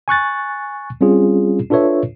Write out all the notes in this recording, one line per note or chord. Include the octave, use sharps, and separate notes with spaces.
G#5 C#6 F#6 A6
G3 C4 C#4 F4 G#4
D4 F4 A4 B4 C#5 E5